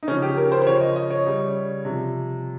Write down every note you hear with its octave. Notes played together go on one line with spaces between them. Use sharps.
D#4
C#3 F3 C#4
G4
A#4
C5
C5
C#3 F3 C#5
D#5
D#5
C#5
C#3 G3
C3 F3